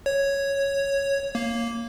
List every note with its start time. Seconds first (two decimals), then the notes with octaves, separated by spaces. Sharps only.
0.06 C#5
1.35 A#3